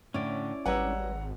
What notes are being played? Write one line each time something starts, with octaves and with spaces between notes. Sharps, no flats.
A2 D3 C#4 E4 D5
G#1 G3 B4 C#5 F#5 A#5 E6